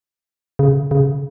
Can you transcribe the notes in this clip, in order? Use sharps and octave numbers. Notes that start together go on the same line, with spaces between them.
C#3
C#3